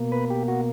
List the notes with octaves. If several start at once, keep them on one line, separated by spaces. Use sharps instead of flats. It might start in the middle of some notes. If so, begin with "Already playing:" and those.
Already playing: B2 A#3
B4
G4
F#4